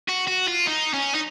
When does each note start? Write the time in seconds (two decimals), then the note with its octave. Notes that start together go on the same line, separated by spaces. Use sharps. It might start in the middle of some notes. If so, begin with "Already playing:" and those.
0.08 F#4
0.27 F#4
0.48 F4
0.67 D#4
0.94 C#4
1.14 D#4